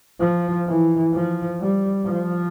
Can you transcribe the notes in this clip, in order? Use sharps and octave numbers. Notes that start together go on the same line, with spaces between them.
F3
E3
F3
G3
F3